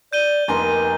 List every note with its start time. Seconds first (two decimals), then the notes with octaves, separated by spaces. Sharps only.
0.13 D5 G6 D#7 G7
0.48 F1 A#3 D#4 B4 G#5 A#5 C6